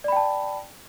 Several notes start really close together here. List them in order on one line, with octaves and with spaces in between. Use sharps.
D5 B5 G5 A5